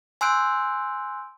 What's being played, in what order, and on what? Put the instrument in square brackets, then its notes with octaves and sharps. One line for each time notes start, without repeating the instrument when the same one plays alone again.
[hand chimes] G#5 C6 E6 F#6 G6 D7